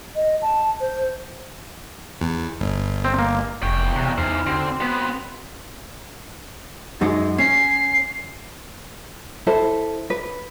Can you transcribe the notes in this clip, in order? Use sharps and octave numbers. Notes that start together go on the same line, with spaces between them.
D#5
A5
C5
E2
G1
C4
A#3
F1 E2 G5 C#6
C3 A#5 F#6
E2 E3 C4 D#4 C5 F6
D3 C4 F#4 C6
B3 C4 B4
F#2 G#3 D#4
C#4 C7
E4 A4 C5
B4